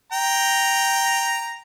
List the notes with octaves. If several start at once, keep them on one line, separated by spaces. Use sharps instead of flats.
G5 A#5